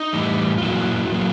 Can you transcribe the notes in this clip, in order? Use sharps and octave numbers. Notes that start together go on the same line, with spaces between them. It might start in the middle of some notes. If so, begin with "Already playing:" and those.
Already playing: D#4
A2 E3 G3
F4
A#2 F#3 A#3 E4 F#4
A#2 F#3 A#3